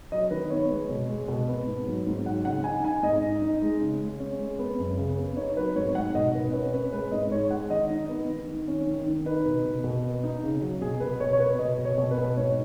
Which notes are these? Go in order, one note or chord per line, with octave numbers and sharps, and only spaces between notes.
F#3 D#5
D#3 B4
B3 C#5
G#3
B2
G#3
B2
B3
G#2
F#3
G#2
F#3 F#5
C#3 F#5
D#4 G#5
D#4 G#5
G#2 D#5
D#4
D#4
G#3
C#3
G#3
C#4
G#3
B3
F#2
C#3
B3
D#4 C#5
F#3 B4
G#2 C#5
G#2 F#5
B2 D#5
B2 B4
C#4 B4
C#4 B4
G#3 B4
G#2 D#5
G#3 C#5
G#3 F#5
D#3 D#5
D#4
B3
D#3
D#3
C#4
D#3
D#3
D#4 B4
B2
B2
B2
B3
D#4
C#3
F#3
B2 G#4
B2 B4
B2 C#5
C#5
B3 B4
B2 D#5
B2
C#5
B2
B4
B2
G#2 C#5